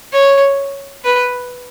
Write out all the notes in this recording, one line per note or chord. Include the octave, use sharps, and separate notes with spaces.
C#5
B4